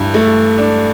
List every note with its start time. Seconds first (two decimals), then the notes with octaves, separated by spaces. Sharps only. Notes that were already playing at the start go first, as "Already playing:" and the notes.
Already playing: G2 E3
0.14 A3
0.58 D4